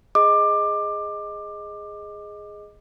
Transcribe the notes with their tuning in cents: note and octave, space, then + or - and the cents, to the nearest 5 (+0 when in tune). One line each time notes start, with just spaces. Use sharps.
G#4 +0 D#5 +0 D6 +20